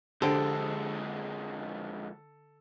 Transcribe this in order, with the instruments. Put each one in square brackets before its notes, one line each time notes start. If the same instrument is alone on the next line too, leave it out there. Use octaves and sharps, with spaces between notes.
[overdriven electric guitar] F2 G#3 [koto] D3 [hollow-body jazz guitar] G4 C5 G5 [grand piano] A4